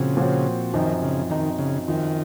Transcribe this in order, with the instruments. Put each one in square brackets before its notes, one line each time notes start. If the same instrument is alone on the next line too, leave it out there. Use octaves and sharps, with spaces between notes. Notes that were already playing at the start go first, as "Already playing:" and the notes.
Already playing: [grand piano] A#2 F3 C4 F#4 [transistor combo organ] C#3
[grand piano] A#2 F3 C4 F#4 C#5
[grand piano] F#2 F3 C4 D#4 [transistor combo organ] D#3
[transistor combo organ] C#3
[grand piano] F#2 F3 C4 D#4 [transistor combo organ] D#3
[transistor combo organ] C#3
[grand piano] F#2 F3 C4 F4 [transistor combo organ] D#3